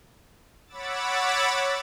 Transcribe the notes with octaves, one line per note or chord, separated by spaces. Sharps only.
C#5 F#5 B5 D6 E6 A6